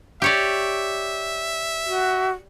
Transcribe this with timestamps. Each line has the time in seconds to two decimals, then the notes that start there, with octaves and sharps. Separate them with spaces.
0.22 G4 C#5 D5 E5
1.87 F#4